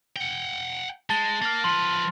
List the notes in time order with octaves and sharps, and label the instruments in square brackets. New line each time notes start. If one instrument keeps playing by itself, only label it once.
[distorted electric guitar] F#5 G5
[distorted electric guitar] G#3 [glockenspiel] A5 A6 G7
[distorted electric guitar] A#3 [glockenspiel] F6 A6
[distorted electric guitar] F3 B4 [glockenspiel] C6